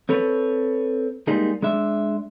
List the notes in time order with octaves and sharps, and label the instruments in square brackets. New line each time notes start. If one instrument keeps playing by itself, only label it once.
[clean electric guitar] C4 A4 B4 C#5
G3 G#3 A#3 D#4 G#4
G#3 D4 E5